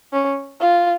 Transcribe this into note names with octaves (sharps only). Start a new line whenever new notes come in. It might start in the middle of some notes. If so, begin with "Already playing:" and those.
C#4
F4